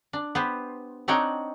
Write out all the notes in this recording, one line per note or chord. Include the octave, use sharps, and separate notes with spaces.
D4
B3 G4 B4 C5
C4 D4 D#4 C#5 F#5 G5